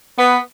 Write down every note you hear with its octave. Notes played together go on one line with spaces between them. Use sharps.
B3